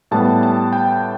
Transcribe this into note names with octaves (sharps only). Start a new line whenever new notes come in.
A2 G3 B3 A5
A5
G5